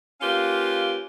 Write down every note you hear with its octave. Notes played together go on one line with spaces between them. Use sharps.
A#3 C#4 F4 G4 B4 F5